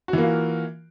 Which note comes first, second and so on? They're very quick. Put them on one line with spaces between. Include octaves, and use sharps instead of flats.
F#4 E3 A#3 F4